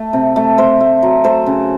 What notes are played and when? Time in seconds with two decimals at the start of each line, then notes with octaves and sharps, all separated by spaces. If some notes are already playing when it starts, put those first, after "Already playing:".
Already playing: A3
0.13 C3
0.36 A3
0.58 A3 C5
0.81 A3
1.03 F#3
1.24 A3 C5
1.46 C#3